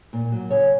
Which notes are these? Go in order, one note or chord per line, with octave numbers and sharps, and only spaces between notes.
A#2
F#3
C#3 C#5